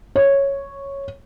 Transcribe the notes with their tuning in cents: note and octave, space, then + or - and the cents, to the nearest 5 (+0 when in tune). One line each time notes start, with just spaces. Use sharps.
C#5 -5